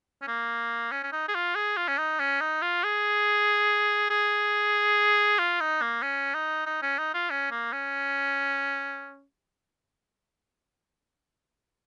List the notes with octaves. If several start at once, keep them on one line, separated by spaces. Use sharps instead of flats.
C#4
A#3
C#4
C#4
D#4
G#4
F4
G#4
F4
C#4
D#4
C#4
D#4
F4
G#4
G#4
F4
D#4
A#3
C#4
D#4
D#4
C#4
D#4
F4
C#4
A#3
C#4